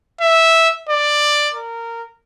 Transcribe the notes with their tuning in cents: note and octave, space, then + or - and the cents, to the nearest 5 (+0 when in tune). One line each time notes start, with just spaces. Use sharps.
E5 -10
D5 +10
A#4 -15